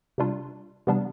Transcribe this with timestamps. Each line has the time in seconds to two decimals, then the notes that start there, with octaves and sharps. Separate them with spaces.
0.18 C3 G3 D4 F4
0.87 C3 E3 G3 B3 D4